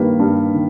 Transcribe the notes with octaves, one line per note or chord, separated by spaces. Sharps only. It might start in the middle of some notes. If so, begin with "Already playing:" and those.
Already playing: G2 D#3 G3 A#3 B4
G2
D#3